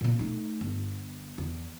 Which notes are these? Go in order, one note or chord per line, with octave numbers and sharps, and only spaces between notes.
A#2 A#3
A3 D#4
G1
E2